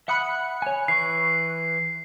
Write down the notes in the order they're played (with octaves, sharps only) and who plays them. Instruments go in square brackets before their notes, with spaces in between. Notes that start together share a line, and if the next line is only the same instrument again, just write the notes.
[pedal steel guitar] E5 F#5 D#6 [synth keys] B5 F#6 C#7
[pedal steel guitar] C#5 G#5
[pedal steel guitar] E3 C#6 [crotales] C7